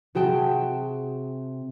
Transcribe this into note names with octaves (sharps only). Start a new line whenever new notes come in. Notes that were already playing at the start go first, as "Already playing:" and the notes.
C3 F#4 G#4 G5 A5